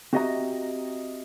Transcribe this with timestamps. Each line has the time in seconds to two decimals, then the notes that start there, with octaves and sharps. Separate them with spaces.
0.13 C4 F#4 G4 D#5 E5 A#5